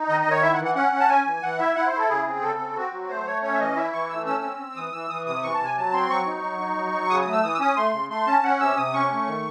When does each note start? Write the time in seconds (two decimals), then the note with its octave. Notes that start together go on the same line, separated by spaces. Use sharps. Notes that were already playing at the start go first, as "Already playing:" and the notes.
Already playing: D#4
0.09 D#3 D#5
0.21 D#5
0.26 D#3 C#5
0.42 E4 E5
0.54 F#5
0.59 E3
0.65 F#5
0.75 C#4 F#5
0.93 C#4
1.00 A5
1.09 C#4 G#5
1.26 E3
1.43 E3 F#5
1.59 E4 E5
1.75 E4 F#5
1.87 C5
1.93 E4
1.98 A4
2.09 C#3 G#4
2.27 C4
2.42 C#3 A4
2.59 C4
2.76 C4 F#4
2.93 F#3
3.09 A3 C5
3.26 A3 C#5
3.43 C#4 C#5
3.53 E5
3.60 E3 D#5
3.76 E4 E5
3.93 E3 C#6
4.10 A3 E6
4.26 C#4 E6
4.43 C4
4.59 C4
4.76 E3 D#6
4.93 E3 E6
5.09 E3 D#6
5.26 C3 D#6
5.43 E3 C#6
5.54 A5
5.59 C3
5.65 G#5
5.76 F#3 A5
5.93 C4 C6
6.10 F#3 C#6
6.26 D#4
6.43 F#3
6.59 D#4
6.76 F#3
6.93 F#3
7.10 C#3 D#6
7.22 A3 D#6
7.33 E6
7.43 E3 D#6
7.55 E6
7.60 C#4 D#6
7.76 A3 C6
7.93 C#3
8.10 A3 C6
8.27 C#4 A5
8.43 C#4 F#5
8.60 C3 E6
8.77 C3 D#6
8.94 C#4 C#6
9.11 A3
9.27 D#3